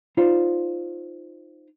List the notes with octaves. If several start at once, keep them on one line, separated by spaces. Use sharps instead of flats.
D#4 F4 C5 D5